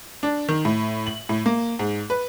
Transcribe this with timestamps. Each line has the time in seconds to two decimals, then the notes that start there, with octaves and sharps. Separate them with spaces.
0.23 D4
0.49 D#3
0.65 A2
1.07 F#7
1.29 A2
1.46 A#3
1.79 G#2
2.10 B4